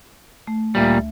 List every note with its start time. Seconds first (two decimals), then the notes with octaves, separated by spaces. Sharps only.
0.47 A3
0.75 D2 A#2 G3 E5